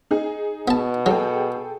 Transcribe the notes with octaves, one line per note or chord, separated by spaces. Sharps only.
D#4 G#4
B2 B3 A5
F#3 G#4 A4 G5